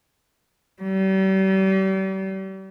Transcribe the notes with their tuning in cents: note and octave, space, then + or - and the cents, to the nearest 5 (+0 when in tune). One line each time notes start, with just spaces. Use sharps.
G3 -40